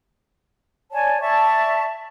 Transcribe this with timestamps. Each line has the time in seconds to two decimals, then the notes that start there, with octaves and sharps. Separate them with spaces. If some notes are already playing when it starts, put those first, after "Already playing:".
0.92 C#5 D5 G#5 A5
1.20 D5 E5 A5 C#6